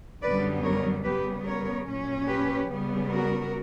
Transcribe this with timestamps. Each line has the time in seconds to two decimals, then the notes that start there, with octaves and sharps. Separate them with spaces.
0.22 F#2 D3 G3 B3 B4 D5
0.64 A#4 C#5
1.04 C#3 G3 B3 G4 B4
1.45 A#4 C#5
1.86 A#2 F#3 C#4
2.26 G4 B4
2.68 C#3 G3 B3
3.09 F#4 A#4